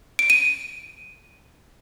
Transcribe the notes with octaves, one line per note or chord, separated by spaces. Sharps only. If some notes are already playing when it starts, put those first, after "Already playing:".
D7
D#7